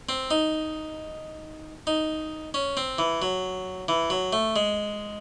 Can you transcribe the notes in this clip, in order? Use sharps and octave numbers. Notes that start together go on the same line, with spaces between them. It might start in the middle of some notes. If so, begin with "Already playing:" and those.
C4
D#4
D#4
C#4
C4
E3
F#3
E3
F#3
A3
G#3